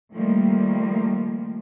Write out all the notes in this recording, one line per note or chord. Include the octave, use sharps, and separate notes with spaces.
D#3 F3 G3 A3 A#3